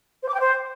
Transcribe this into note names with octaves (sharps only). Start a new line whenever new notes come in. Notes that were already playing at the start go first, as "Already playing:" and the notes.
C5
D6
G5
C5